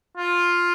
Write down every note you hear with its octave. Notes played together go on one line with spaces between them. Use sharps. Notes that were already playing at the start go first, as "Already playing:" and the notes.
F4